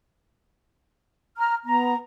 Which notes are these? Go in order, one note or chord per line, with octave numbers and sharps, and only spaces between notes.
A#5 F6
B3 A#5